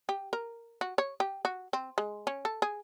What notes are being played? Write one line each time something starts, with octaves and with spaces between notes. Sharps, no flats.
G4
A#4
F#4
C#5
G4
F#4
C4
G#3
C#4
A4
G#4